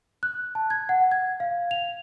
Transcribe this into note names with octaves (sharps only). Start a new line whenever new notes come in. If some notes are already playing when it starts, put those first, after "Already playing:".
F#6
A5
G#6
F#5
G#6
F5
F7